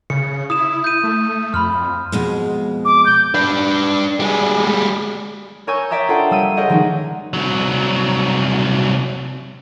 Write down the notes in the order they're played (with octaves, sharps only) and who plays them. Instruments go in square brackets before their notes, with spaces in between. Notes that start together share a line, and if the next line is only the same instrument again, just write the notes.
[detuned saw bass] C#3 [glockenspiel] C#7
[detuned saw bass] E4 [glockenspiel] D#6 E7
[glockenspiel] G6 D#7
[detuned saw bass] A3
[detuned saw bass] F2 [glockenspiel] B5 C6 F6
[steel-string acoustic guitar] F2 B2 G#3
[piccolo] D6
G6
[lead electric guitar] D4 B4
G3 G#3
[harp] A#4 C#5 G#5 C#6 E6 G6
C#5 D5 E5 G5 A#5 D#6
D4 F4 A4 C5 F#5 G5
G3 D#6 E6 D#7
G#4 A#4 C#5 D#5 F#5 G5
D#3 F3 G3 G#3 C#4 D#4
[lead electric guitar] C2 F#3